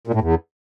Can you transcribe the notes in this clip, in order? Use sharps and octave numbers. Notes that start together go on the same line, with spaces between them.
A#2
A2
E2